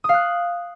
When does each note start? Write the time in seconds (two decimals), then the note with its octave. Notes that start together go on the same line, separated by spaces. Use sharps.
0.04 D#6
0.09 F5
0.14 F#6